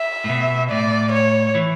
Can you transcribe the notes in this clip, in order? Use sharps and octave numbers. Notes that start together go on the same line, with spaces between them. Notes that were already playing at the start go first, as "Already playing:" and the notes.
Already playing: E5
A2
B2
A2 D5
C#5
E3